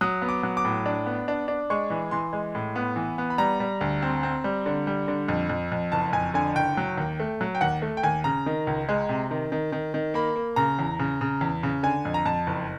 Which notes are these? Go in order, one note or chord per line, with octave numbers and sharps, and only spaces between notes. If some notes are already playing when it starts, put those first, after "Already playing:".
F#3 D#6
B3
D6
F#3
D6
A2
D4
B3
D4
D4
G#3 C#6
E3
E3 C6
G#3
A2
B3
E3
B3
B5
G3 A#5
G3
D2
C4
C4
G3
D3
G3
D3
F2
F2
F2
F#1 A5
F2 G#5
D3 G#5
F#1 G5
F#3
D#2
A3
F#3
G5
D#2 F#5
A3
G5
D#2 G#5
C#3 A#5
D#3
C#2
G#3
C3
D#3
D#3
D#3
D#3
A#3 B5
A#3
C#3 A#5
E2
C#3
C#3
E2
C#3
D3 G#5
F2
A#5
F2 A5
F#1